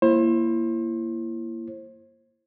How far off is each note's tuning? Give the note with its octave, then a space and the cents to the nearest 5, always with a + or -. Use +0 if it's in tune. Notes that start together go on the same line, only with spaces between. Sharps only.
A#3 +0 E4 +25 C5 +35